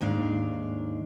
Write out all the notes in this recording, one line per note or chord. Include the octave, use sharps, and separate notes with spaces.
D#2 G#2 D4 F5